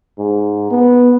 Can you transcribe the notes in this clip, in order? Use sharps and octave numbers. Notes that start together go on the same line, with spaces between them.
G#2
B3